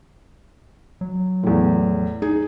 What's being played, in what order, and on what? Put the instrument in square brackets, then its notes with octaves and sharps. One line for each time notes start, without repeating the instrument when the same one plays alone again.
[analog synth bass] F#3
[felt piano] E2 A2
[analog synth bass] D#4 [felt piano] G#4